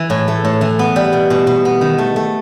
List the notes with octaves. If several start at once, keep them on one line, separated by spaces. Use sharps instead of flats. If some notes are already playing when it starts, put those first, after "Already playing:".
Already playing: E3
A2
A3
A2
E3
B3
G3
B2
B2
B2
B3
D#3
A3
A3